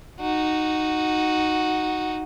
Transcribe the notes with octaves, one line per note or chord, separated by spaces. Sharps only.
D#4 F#4